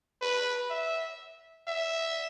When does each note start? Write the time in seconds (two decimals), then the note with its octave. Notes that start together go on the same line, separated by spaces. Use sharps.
0.22 B4
0.70 E5
1.67 E5